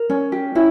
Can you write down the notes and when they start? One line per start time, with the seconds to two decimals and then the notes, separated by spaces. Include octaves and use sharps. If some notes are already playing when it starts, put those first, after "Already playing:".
Already playing: A#4
0.10 C#4
0.32 G4
0.55 C#4 E4